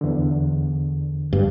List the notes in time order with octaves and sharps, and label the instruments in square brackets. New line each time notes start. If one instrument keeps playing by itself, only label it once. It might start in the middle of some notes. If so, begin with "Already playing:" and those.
[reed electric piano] E2 D3
[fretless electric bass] G2